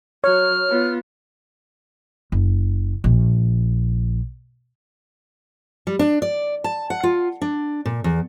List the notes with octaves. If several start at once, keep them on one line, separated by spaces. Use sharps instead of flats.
F#3 C#5 F6
B3 F4
F#1
A#1
G3
D4
D5
A5
F#5
F4
D4
A#2
E2